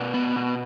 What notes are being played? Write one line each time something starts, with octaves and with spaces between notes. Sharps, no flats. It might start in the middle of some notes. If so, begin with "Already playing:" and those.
Already playing: B2 B4 D5
B3
B2